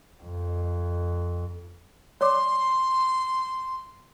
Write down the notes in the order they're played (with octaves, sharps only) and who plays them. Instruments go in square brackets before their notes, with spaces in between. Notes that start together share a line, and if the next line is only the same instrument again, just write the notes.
[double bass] F2
[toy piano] C#5 D5 D6 [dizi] C6